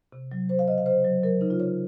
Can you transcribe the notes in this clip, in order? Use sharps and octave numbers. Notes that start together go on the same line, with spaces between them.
C3
F#3
F#3 C5
F5
C#3 D#5
F5
C#3 C5
F#3
F#3 A#4
C#3 D#4
F4
C#3 C#5